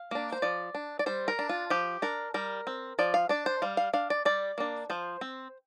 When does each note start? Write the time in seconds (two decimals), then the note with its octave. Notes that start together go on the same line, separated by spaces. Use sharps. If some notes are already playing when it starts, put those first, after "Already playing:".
Already playing: F5
0.11 A#3 D4
0.32 C5
0.42 F3 D5
0.75 D4
0.99 D5
1.06 G3 C5
1.28 A#4
1.39 D4
1.49 F4
1.70 F3 G4
2.02 D4 A#4
2.34 G3 A#4
2.67 C4
2.99 F3 D5
3.14 F5
3.29 D4 D5
3.46 C5
3.62 G3 F5
3.77 F5
3.93 D4 F5
4.10 D5
4.25 G3 D5
4.58 A#3 D4
4.90 F3 C5
5.21 C4